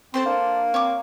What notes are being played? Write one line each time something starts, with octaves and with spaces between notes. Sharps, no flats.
C4 A4 C5 C6
A#3 D4
C4 C#5 D6